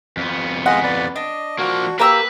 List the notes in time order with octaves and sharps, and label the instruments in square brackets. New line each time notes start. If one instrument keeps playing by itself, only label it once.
[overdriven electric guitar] F2 B3
[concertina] G#3 F4 D#5 [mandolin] F#5
[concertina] B4 D5
[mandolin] D4 [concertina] D#5
[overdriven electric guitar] F3 A#3 [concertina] F#4
[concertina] A#3 G4 [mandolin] A#4 A#5 E6 [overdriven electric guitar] B4